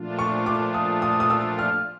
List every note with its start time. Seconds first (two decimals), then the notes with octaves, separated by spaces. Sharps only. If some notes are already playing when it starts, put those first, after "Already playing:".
Already playing: A#2 F3 A3 D4 F4
0.19 C#6
0.46 D6
0.74 D#6
1.02 D#6
1.20 D#6
1.30 E6
1.59 F6